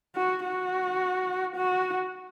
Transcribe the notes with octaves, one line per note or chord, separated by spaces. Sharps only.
F#4
F#4
F#4